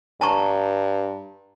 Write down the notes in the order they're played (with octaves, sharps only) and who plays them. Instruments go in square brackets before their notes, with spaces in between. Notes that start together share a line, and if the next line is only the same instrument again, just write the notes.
[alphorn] G2 [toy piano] A5 A#5 C#6